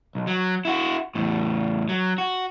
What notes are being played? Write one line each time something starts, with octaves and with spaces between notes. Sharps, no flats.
B1
F#3
E4 F#4
E2 A2
F#3
F#4